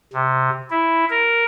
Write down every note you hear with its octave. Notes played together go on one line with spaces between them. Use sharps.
C3
E4
A#4